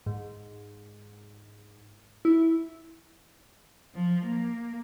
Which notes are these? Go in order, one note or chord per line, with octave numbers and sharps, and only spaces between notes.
G#2
E4
F3
A#3